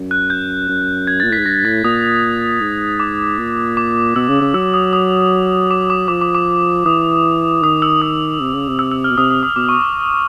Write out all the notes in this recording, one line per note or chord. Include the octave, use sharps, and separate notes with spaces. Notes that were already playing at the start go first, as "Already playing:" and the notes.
Already playing: F#2
F#6
G6
F#2
G#6
A6
A#2
A2 B6
G#2
G2 A#6
A2 A6
A#2 D#6
G#2
D6
A#2
D6
B2 E6
C#3
C#3
F#3 E6
D#6
D#6
D6
D6
F3 D6
D6
D6
E3 D#6
D#3 D#6
E6
D#6
C3
C#3
C3
E6
E6
F6
B2
C3 D#6
D#6
D#6
B2 D6
C#6